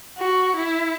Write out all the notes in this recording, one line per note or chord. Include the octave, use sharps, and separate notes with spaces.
F#4
E4